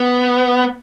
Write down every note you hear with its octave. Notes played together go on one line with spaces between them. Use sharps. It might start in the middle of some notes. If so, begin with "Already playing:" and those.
Already playing: B3